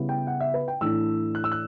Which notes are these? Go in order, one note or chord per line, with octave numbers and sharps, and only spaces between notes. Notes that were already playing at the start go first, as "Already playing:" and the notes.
Already playing: C#3 G3 B3 E4
G5
F#5
E5
B4
G5
A2 E3 A3 D4 E6
F#6
E6
F#6